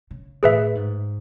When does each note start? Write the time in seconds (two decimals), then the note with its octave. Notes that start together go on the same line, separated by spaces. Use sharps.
0.11 C#3
0.43 A2 G#4 B4 E5
0.75 G#2